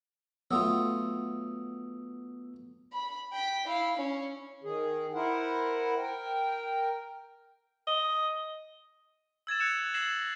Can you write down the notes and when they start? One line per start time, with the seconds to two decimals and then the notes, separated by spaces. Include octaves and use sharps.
0.51 F#3 A3 B3 F4 D#6 E6
2.93 B5
3.33 G5 B6
3.67 E4 F5
3.97 C#4
4.64 D#3 G#4
5.14 E4 A#4 C5 F#5
5.98 A#4 G5
7.87 D#5
9.47 E6 G#6 A6 E7
9.59 F#6 C#7 E7 F7
9.94 E6 G#6 A#6 C7 E7 F#7